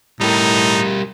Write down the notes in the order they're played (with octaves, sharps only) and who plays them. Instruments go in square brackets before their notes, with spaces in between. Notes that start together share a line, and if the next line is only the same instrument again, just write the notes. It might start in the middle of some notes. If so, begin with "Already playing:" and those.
[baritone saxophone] A2 [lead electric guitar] G3 A#4 [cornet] D#4